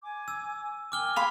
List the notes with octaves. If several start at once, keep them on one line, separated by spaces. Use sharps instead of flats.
G#5 D6
E6
A#4 G5 G#5 D6 F6 G7
F5 B5 C6 F7